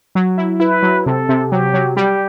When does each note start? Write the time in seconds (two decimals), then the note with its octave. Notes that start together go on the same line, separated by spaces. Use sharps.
0.15 F#3
0.38 E4
0.60 E4 B4
0.83 F#3
1.06 C3 A4
1.29 C3
1.51 F#3 G4
1.74 F#3
1.97 G3 G4